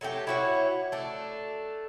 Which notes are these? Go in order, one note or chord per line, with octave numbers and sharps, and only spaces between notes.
F#3 A3 F4 G4
E4 F#4 C#5
A3 D4